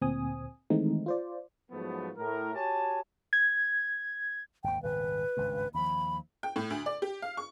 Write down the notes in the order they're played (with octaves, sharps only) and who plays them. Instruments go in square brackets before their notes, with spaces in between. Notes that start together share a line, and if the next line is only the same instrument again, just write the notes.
[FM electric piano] D2 A#2 C4 G#5 D#6
D#3 E3 G#3 A3 C4 D#4
F4 C5 D5
[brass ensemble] G#2 F3 F#3 A3 B3
A2 A#4
F#4 G4 C#5 G#5 A5
[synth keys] G#6
[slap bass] G#1 D#2 [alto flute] G5
[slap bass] D#1 G#1 C#3 [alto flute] B4
[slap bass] G#1 C#2 G2
[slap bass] D#2 F3 [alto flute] B5
[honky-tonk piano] G5
A2
D2
D5
G4
F5
C#6